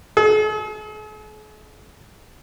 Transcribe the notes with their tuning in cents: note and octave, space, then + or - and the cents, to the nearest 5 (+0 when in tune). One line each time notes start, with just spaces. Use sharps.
G#4 +45